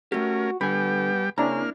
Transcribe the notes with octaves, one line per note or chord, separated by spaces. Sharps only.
A3 C#4 F#4 G4 A#4
D3 G3 B3 G5 G#5 B5
C#3 A#3 C4 D4 E4 A#5 F6